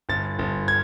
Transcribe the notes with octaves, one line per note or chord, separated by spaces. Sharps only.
G1 A6
G1
G#6